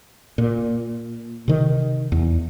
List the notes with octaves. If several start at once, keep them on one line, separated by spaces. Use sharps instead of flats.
A#2
C3 D#3
E2